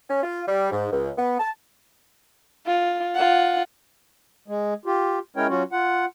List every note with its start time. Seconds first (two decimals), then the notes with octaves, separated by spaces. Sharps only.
0.09 C#4
0.23 F4
0.48 G3
0.71 G#2
0.91 C#2
1.18 B3
1.39 A5
2.66 F4
3.15 F4 F#5
4.48 G#3
4.86 F4 G4
5.36 G#3 C#4 E4 A#4 C#5 G5
5.49 F#3 C#4 F4 F#4
5.72 F4 F#5